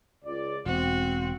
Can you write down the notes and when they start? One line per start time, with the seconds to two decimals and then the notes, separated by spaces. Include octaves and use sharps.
0.23 C#2 D5
0.66 E1 C4 F#4